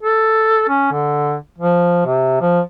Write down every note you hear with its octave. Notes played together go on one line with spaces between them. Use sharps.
A4
C#4
D3
F3
C3
F3